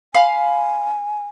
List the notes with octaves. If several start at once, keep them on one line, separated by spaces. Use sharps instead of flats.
F5 G#5 B5 C6